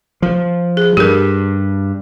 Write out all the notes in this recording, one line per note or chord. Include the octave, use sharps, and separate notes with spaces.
F3
G#4
G2 G4 A#4